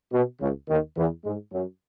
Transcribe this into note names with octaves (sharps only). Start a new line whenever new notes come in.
B2
C#2 C#3
D#2 D#3
E2 E3
G#2 G#3
F#2 F#3